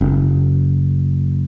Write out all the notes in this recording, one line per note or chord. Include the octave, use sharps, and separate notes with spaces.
F#1